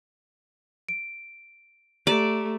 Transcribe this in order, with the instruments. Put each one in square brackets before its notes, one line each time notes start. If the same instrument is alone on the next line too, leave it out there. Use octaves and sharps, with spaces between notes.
[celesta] D7
[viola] A3 [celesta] G4 A#5 E7 [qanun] D5